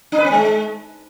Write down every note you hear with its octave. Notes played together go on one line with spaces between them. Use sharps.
D4
B4
C4
G#3